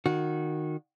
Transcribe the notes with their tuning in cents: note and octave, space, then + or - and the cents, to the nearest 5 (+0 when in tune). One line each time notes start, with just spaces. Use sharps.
D#3 -20 F#4 -20